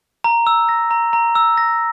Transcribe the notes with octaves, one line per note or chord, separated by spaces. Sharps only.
A#5
E6
A#6
A#5
A#5
E6
A#6